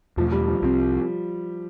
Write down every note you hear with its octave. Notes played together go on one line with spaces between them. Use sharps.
E2 B2 F3 A3
G3
F3
C2 C3 F3 G3 C4